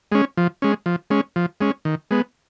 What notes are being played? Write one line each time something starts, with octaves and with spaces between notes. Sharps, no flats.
G#3 C#4
F3
G#3 C#4
F3
G#3 C#4
F3
G#3 C#4
D#3
G#3 B3